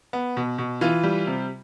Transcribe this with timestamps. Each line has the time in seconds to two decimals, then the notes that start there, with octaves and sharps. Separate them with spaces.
0.13 B3
0.37 B2
0.58 B2
0.81 E3 F4
1.03 G3
1.27 C3